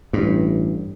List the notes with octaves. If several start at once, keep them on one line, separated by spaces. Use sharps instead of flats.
A1 G2